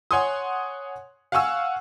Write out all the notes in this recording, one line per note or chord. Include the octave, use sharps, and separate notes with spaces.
C#5 F#5 G#5 C6 D#6
F5 F#5 G#5 C#6 E6